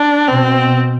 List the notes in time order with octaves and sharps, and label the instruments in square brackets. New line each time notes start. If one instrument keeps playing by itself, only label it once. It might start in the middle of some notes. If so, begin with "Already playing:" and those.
Already playing: [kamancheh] D4
[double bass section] B2 [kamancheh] C4